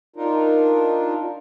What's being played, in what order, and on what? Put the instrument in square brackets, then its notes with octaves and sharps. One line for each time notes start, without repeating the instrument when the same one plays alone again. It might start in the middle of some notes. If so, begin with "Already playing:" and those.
[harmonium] D4 D#4 F4 A#4